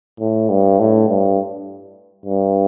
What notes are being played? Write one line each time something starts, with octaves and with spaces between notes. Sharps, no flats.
A2
G2
A2
G2
G2